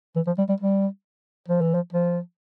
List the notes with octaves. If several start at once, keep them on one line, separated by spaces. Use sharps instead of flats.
E3
F3
G3
G3
G3
F3
E3
F3
F3